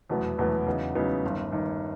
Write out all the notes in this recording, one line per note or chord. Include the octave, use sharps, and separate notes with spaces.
F1 E2 B2 F#3 B3
F1 E2 B2 F#3 B3
E2 C#3 F#3 B3 D#4
E2 C#3 F#3 B3 D#4
G1 G2 D#3
G1 G2 D#3